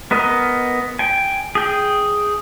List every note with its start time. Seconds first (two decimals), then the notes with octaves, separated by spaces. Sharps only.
0.11 B3 A#4 D#5
0.99 G5 G#5
1.55 G#4 G5